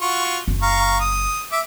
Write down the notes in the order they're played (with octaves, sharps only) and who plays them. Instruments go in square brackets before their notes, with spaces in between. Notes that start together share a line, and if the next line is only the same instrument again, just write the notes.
[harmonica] F4 F#4 C#6
[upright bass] F#1
[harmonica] F5 A#5 C#6
D#6
E5 D6